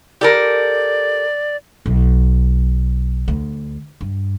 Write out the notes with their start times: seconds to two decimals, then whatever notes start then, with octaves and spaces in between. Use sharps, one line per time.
0.21 G4 A4 A#4 D5
1.86 B1
3.28 D2
4.01 G2